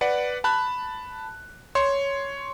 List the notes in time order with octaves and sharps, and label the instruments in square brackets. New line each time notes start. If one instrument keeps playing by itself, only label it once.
[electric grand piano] B4 D5 F#5
A5 B5 F#6
C#5 C6